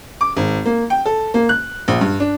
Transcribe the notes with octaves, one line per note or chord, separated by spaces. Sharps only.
D6
G#1
A#3
G5
A4
A#3
F#6
A#1
G2
D4